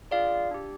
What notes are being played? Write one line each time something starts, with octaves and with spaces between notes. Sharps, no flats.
D4 F4 G#4 D5 F5
D4 G4